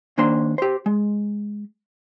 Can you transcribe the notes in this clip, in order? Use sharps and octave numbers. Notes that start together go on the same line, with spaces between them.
D#2 A#3 D4 C5 C6
G4 C5
G#3